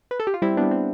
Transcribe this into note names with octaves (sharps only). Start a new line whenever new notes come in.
B4
A4
G4
F4
G3 C4 E4
G3 B3 D4
C4